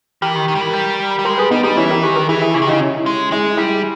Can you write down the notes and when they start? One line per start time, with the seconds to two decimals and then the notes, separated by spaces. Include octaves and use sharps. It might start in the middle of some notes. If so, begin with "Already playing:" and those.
0.22 E3 G4 A#4
0.35 D#3
0.48 D#3
0.55 G3
0.61 E3
0.73 G3
1.19 G3
1.25 G#3 G4 A#4
1.38 G3 G#4 B4
1.51 G3 B3 D#4
1.64 G3 D#4 G4
1.77 E3 C#4 E4
1.90 G4 A#4
2.03 D#3 G#4 B4
2.16 G4 A#4
2.28 E3 E4 G#4
2.42 E4 G#4
2.54 C#3 E4 G#4
2.62 D#3
2.67 C#3 D#4 G4
2.81 C#4 E4
3.06 G#3
3.32 G#3 E4 G#4
3.57 G3 E4 G#4